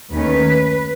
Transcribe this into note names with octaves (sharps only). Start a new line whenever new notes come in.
D#2 D#3 A3 C#4 B4